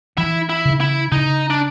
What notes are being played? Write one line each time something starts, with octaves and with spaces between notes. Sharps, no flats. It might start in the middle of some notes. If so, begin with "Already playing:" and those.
E3 E4
E4
C#3
E4
C#3 D#4
D4